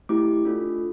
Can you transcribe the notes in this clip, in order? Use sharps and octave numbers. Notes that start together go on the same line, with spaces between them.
A3 E4 G4 D6
A3 D4 F4 A4